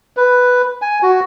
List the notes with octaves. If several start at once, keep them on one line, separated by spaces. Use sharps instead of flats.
B4
G#5
F#4